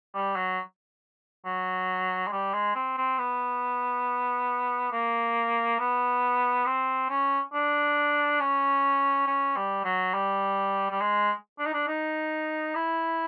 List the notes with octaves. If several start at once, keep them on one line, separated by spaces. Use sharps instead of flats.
G3
F#3
F#3
G#3
G3
G#3
C4
C4
B3
A#3
B3
C4
C#4
D4
C#4
C#4
G3
F#3
G3
G3
G#3
D4
D#4
D4
D#4
E4